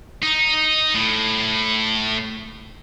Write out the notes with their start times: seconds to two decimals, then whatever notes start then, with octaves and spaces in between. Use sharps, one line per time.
0.23 D#4
0.94 A2